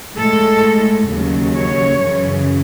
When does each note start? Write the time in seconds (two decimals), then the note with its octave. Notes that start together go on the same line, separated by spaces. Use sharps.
0.17 A2 G#3 A4
1.09 D#2 C#3 F#3
1.55 C#5
2.02 F#2 C#3 E3